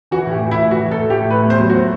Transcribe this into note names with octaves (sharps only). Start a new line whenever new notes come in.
E3 F#4
A2
G4
E3
E4
A2
E3 F#4
A2
A4
A3
G4
A2
A3 B4
E2 C5
F#3
F#4
A3